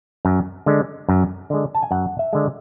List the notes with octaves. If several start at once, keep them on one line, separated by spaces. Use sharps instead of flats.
F#2
D3 G#3
F#2
D3 G#3
A5
G#5
F#2 F#5
E5
D3 G#3